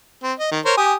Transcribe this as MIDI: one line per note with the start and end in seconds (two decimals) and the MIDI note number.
0.23 0.33 60
0.39 0.51 75
0.51 0.60 51
0.65 0.75 70
0.65 0.75 72
0.65 0.75 73
0.77 0.94 67
0.77 0.94 80
0.77 0.94 87